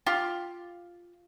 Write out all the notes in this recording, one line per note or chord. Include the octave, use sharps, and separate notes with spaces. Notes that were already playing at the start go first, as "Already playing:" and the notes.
F4 G4